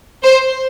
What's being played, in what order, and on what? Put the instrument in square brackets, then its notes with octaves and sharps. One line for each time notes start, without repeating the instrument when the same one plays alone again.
[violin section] C5